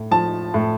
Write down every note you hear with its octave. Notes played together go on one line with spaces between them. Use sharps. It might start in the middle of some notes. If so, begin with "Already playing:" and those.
Already playing: A2
F3 A5
A2